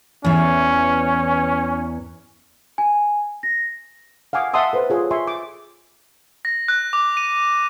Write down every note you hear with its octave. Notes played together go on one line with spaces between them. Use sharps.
E2 E3 C#4
G#5
A#6
F5 F#5 G#5 D6 D#6
E5 F#5 A5 C6 D#6 E6
A4 B4 C5
F4 G#4 C#5
E5 G#5 C6 C#6
D6
A#6
F#6
D6
D#7